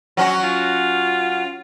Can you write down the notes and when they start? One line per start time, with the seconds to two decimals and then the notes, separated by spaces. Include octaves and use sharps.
0.17 F#3 C#4 F#4
0.44 F4